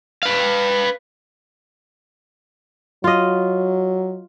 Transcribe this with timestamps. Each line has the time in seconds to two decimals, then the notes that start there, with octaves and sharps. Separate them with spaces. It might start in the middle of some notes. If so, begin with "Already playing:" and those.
0.23 B4 F5
3.04 F#3 F4 D#5